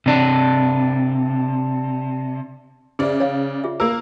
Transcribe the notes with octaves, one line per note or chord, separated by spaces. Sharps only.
C3 D4
C#3 G#4 C5 D5 E5
C#5 F5
F4 G#4 E5
A#3 F4 A#4 E6